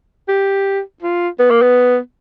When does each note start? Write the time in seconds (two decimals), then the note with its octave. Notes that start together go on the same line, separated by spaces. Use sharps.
0.28 G4
1.02 F4
1.39 B3
1.50 A#3
1.62 B3